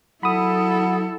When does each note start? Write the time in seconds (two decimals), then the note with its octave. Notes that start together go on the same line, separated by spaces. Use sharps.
0.23 F#3 E4 A4 F#5 B5 D#6